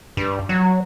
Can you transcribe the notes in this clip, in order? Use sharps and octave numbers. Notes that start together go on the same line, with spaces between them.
G2
F#3